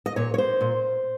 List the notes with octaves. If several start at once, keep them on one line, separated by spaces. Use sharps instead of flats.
D#5
A#2 C#5
C#5
C5
A#2